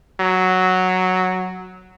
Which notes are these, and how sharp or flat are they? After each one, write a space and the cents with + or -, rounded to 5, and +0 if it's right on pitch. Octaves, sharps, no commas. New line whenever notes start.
F#3 +0